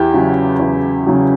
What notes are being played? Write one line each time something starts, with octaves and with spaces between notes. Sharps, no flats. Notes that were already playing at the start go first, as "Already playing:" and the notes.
Already playing: E2 E4 G4
C#3 F#3
E2
C#3 F#3